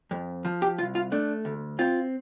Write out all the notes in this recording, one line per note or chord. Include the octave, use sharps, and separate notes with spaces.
F2
F3
G4
C2 F4
F4
A3 D4
D2
C4 F4